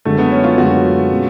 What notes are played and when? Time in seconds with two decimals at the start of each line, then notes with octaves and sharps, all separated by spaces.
0.05 F#2 D3 G#3 A3
0.19 B3
0.32 C#4
0.44 F4
0.58 F#2 D3 G#3 F#4
1.10 B2 G#3 C#4